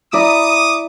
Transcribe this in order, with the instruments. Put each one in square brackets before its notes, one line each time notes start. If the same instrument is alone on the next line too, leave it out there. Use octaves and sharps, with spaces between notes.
[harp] E4 D5 A#5 [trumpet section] D6 D#6